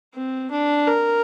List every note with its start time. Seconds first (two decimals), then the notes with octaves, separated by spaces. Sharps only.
0.15 C4
0.51 D4
0.88 A#4